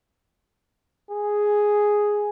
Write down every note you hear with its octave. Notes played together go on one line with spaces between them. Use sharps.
G#4